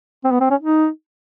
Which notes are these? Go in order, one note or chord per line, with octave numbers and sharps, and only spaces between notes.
C4
B3
C4
C#4
D#4